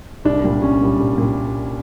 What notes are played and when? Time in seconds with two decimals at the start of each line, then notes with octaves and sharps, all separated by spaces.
0.25 C2 D4
0.44 A#2 G3
0.62 C2 C#4
0.80 A#2 G3
0.99 C2
1.18 A#2 G3